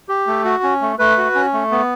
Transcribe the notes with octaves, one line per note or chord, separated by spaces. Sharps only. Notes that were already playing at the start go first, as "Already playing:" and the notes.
G4
A3
F#4
C#4
A3
A3 B4
F#4
C#4
A3
B3